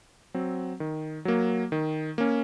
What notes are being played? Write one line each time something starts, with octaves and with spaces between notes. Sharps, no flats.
F#3 C4
D#3
F#3 A#3
D#3
A#3 C#4